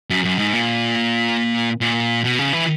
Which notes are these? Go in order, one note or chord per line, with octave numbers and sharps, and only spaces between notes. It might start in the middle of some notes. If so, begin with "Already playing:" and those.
F#2
F#2
G#2
A#2
A#2
B2
C#3
E3